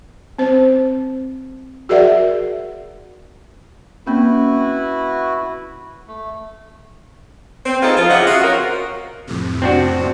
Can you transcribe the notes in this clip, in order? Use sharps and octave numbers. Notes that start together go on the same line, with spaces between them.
C4 C5
F#4 G#4 A#4 D5 E5 F#5
A#3 C4 C#4 E4 F#4 B4
A3
C4
B3 D#4 F4 G#4 A4
F3 F4
C#3 G4 D#5 E5 F#5
F4 F#4
C4 C#4 F#4 A#4
F2 A2 C3
C4 D4 F#4